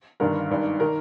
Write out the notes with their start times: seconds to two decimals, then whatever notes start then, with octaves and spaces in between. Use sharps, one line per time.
0.20 G1 G2 D#3 A#4
0.50 G#1 G2 D#3
0.80 D#3 A#4